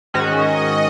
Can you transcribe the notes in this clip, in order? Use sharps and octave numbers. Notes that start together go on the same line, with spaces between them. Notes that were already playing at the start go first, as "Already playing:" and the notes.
G#2 D#3 G#3 C#4 F#4 D#5